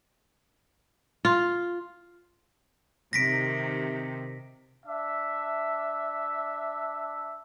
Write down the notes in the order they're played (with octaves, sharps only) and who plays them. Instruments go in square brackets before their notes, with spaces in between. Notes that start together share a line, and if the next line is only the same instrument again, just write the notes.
[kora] F4
[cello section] C3 D#3 [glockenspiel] A#6 B6 D7
[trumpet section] D4 E5